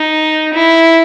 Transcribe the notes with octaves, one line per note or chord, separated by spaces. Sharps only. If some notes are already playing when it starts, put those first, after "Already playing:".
Already playing: D#4
E4